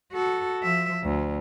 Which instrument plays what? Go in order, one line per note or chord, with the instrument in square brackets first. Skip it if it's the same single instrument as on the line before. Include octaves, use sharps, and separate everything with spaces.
[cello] F#4 A4
F3 E5
D2